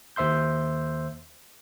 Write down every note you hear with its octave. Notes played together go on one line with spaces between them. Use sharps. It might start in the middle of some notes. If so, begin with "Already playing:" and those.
D#2 C5 E5 C6 G6